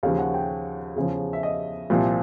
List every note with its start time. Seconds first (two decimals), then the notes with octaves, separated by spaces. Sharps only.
0.03 D#2 C#3 F3 F5
0.19 F#5
0.34 G5
0.96 E2 C#3 F3
1.33 E5
1.43 D#5
1.90 C2 A#2 F3